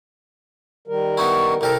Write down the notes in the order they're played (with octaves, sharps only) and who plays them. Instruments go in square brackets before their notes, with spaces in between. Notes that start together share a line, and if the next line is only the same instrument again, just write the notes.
[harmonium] D#3 G3 A#4
[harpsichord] B3 D#4 E4 [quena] C#6
[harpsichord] C2 G4 A4 [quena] A#4